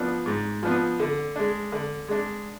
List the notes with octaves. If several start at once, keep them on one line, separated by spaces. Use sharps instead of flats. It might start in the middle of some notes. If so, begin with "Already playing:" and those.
Already playing: F3 B3 D4
G#2
F3 B3 D4
D3
G#3 D4
D3
G#3 D4